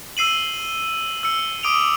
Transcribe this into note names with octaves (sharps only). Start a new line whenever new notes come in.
E6 C7 D#7 F#7
E6 C#7
D6 D#6 D7 F7